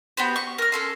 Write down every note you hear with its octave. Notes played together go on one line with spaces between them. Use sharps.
B3 F#4 G4 C5
C#6
A#4 F6
C#4 A4 C6